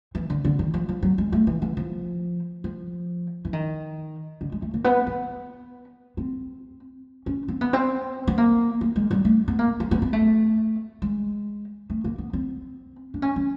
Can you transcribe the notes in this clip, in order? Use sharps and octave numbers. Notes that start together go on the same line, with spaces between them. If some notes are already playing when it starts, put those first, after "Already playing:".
E3
D3
D3
D#3
F3
F3
F#3
G#3
A3
E3
E3
F3
F3
E3
D#3
D3
G#3
A3
A#3
B3
B3
C4
C#4
C4
B3
C4
B3
A#3
A#3
G#3
G3
A3
B3
A#3
A#3
B3
B3
A3
G#3
A3
A#3
B3
C4
D4
C#4
C#4